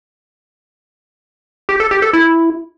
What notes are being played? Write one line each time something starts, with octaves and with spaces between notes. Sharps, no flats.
G4
A4
G4
A4
E4